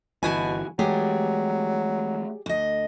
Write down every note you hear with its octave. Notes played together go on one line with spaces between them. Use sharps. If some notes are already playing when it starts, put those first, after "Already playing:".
G1 B2 E3 E4 F#4 G#5
E3 F#3 G#3 A3 G4 G#4 D5
D2 D#5